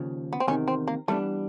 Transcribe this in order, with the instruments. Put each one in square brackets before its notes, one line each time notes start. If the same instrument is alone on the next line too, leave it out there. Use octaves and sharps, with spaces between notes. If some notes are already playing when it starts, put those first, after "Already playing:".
Already playing: [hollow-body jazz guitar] D#2 C#3 F3
[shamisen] B3
C4
[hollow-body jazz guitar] E2 C3 D#3 [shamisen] C#4
[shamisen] C4
A#3
[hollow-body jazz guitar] E3 G3 B3 D4 [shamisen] A3